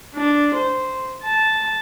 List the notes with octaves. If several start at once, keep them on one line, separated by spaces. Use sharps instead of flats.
D4
C5
A5